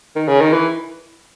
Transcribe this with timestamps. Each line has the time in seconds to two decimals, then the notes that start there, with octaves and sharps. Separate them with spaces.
0.16 D#3
0.28 C#3
0.41 D#3
0.53 E3